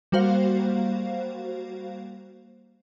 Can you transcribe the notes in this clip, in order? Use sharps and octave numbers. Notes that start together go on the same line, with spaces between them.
G3 A#3 F#4 C5 F5